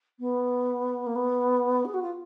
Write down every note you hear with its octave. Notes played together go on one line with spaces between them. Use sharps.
B3
A#3
B3
G#4
F#4
F4